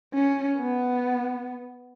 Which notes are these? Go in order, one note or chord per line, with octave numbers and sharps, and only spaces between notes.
C#4
B3